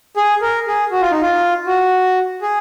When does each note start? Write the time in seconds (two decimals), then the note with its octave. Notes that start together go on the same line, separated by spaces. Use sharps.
0.17 G#4
0.42 A#4
0.67 G#4
0.92 F#4
1.01 F4
1.11 D#4
1.22 F4
1.67 F#4
2.42 G#4